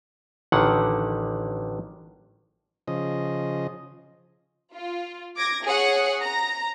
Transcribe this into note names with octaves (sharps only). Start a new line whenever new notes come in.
A1 D3 D#3 F#5
C#3 F3 D#5
F4
D6 G#6 A#6
G#4 C#5 F#5
A#5 A#6